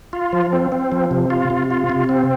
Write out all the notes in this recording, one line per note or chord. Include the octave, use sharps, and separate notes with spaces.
F4
F3
C4
C4
F3
C3
F4
C3
F4
C3
C4